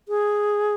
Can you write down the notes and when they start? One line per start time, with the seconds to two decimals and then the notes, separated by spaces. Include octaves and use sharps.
0.09 G#4